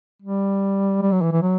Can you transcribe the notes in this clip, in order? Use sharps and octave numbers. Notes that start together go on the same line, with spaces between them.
G3
G3
F#3
E3
E3
F#3